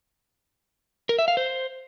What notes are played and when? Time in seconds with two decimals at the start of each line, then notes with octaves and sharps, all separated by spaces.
1.09 A#4
1.19 E5
1.28 F5
1.37 C5